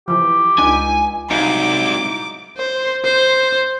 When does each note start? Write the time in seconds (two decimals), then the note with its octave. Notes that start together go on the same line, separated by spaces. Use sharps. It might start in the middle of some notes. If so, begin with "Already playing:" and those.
0.08 E3 F3 G4
0.58 C#2 D4 D#4 G#5
1.31 C2 G#2 F#3 D#4 F5 D6
2.57 C5
3.04 C5